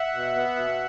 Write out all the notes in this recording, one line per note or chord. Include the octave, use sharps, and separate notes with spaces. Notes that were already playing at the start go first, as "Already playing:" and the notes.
Already playing: E5 F#5
B2
B3
B2